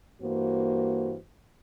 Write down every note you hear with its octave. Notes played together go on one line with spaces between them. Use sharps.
G2 E3 A#3 F#4 C5